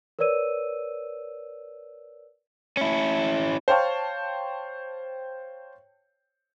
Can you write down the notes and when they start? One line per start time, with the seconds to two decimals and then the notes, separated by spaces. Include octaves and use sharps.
0.19 A#4 B4 C#5 D5 E6 D#7
2.77 C#4 E4
3.68 C5 C#5 F5 G5 A5 C#6